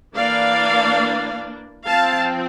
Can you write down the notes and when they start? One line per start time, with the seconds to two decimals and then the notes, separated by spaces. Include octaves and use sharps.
0.16 E3 A#3 D4 D5 F5
1.86 F3 C4 F5 A5